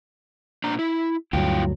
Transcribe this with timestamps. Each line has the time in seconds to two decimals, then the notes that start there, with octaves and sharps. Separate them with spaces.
0.64 A#2 D4 A#5
0.79 E4
1.33 D2 G2 F#3 E4 F4 G5